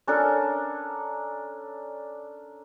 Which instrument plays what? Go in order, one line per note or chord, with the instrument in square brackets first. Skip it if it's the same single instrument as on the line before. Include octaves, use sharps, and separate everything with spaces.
[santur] C#4 D4 A4 A#4